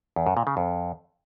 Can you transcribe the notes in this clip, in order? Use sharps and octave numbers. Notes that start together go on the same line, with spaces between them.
E2
F#2
A#2
C#3
F2